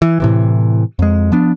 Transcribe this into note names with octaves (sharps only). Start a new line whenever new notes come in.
E3
A2 C3 E3
F2 G#3
F3 B3 D4